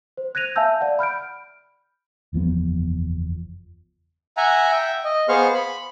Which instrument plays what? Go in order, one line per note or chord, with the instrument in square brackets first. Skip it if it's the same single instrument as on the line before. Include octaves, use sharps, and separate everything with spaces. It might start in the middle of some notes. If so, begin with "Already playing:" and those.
[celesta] C5
F#6 G#6 A#6 D#7 F7
E5 F5 G#5 A5 E6 G6
D5 F#5
B5 F6 G6 D7
[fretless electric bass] F#1 E2 F3 B3
[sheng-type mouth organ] E5 F#5 G#5 A#5
E5 G5
D#5
B3 G#4 C5 F5 C#6 F6
B5